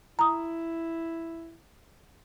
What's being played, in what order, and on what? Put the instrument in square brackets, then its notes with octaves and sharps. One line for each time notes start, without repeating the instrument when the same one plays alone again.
[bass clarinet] E4 [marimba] A#5 D#6